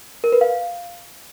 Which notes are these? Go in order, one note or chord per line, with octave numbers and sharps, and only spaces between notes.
A#4
B4
F5